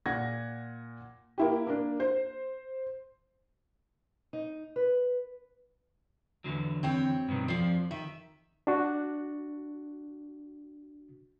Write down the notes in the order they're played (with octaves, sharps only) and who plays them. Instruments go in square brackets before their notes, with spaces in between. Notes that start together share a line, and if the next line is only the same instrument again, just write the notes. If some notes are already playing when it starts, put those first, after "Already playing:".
[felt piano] A#2 F#5 G#6 A#6
A#3 E4 G4
A#3 D4
C5
[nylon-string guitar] D#4
B4
[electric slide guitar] E2 D3 F#3
[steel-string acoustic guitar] C4 C#5 G5
[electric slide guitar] G2 B2 D#3
[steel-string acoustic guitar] F2 D5 [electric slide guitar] F3 F4
[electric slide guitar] D#3 [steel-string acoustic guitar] E5
[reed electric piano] D4 F#4